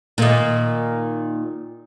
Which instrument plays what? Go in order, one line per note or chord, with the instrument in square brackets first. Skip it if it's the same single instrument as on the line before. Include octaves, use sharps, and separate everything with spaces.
[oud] A#2 D#3